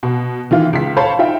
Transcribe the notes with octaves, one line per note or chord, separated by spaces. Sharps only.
B2
D#3 E3 F4
C#2 B6
A4 C5 C#5 F5 A5 B5
D#4 F4 E5 G5